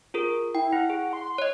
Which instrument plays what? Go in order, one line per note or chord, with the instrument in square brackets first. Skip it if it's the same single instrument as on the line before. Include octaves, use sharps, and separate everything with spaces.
[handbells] F4 G#4 A#4
[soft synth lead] E4 [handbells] G5
[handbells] E4 [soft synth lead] F#5
[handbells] G#4
[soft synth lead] C6
[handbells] C#5 D#5